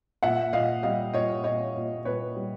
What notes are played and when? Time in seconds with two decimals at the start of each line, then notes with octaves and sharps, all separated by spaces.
0.23 A#2 E5 F#5
0.53 A#2 D#5 F5
0.83 G3 D#5 F5
1.14 A#2 C#5 D#5
1.44 A#2 C#5 D#5
1.75 A#2
2.05 A#2 B4 C#5
2.36 G3